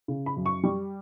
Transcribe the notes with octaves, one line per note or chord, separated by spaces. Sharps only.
C#3
B5
F#2
C#6
G3